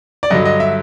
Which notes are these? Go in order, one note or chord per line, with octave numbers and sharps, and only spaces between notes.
D5
G2 D3 F#3 D#5
D#5
E5